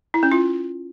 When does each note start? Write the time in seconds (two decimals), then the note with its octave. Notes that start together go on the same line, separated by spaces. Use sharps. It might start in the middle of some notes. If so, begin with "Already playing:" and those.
0.14 E4
0.23 C#4
0.32 F4